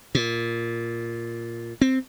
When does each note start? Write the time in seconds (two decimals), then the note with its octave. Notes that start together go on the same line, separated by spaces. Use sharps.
0.15 A#2
1.81 C4